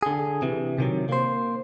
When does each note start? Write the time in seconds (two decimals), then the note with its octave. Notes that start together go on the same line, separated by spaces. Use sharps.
0.03 D3 G#4
0.42 C3 E3
0.78 C3 D#3 F#3
1.09 A#3 C5